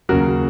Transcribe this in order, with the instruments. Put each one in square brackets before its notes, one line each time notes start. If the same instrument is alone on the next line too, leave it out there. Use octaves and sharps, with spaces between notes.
[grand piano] D#2 C#3 F#3 F#4 A#4